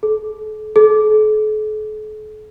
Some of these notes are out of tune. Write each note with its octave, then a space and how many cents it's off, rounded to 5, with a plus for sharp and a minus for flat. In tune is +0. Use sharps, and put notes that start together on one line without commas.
A4 -40
A4 -45